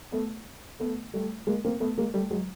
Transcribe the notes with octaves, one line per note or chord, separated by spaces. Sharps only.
A3 B3
A3 B3
G3 A3
G#3 A#3
A#3 C4
A3 B3
G#3 A#3
G3 A3
F#3 G#3